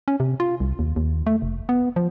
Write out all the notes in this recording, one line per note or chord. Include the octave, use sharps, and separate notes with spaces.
C#4
C3
F4
C2
D#2
D#2
A3
F1
B3
F3